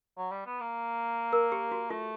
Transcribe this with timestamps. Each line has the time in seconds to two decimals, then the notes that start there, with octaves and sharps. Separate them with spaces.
0.17 F#3
0.31 G3
0.46 B3
0.60 A#3
1.33 A#4
1.52 G4
1.72 F#4
1.90 A3 F4